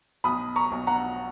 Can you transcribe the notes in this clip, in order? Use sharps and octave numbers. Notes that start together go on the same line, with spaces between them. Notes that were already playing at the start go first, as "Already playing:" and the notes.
B1 B5 D#6
A#5 C#6
B1
F#5 A#5